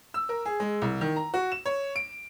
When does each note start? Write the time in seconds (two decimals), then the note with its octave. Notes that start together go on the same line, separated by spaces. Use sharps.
0.14 E6
0.29 A#4
0.46 G#4
0.60 G#3
0.82 C2
1.01 D#3
1.16 A#5
1.34 F#4
1.52 E7
1.65 C#5
1.96 D7